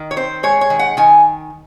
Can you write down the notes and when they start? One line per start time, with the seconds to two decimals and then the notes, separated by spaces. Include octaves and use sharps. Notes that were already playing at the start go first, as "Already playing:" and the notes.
Already playing: D#3
0.11 C#5
0.16 C4 C5
0.43 G#3 C#5
0.61 C#5
0.70 D#3
0.79 F#5
0.97 D#3 G#5